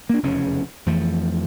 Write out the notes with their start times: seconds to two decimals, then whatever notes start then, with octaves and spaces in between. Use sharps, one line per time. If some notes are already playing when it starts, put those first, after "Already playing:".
0.09 A#3 D4
0.23 F1 E2 C#3 C#4
0.86 F2 E3 F3 A3